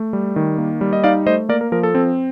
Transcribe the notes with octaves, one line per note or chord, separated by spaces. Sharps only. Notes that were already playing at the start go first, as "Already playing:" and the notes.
Already playing: A3
G3
D#3
A#3
G3
D#5
D#4 D5 F5
A3 C5 D#5
A#3 A#4 D5
A#4
F3 A#4
A4
C4